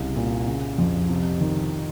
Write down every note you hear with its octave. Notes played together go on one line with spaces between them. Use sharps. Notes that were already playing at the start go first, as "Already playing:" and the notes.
Already playing: C2 C#3
A#2
C#3
F2
C3
D#3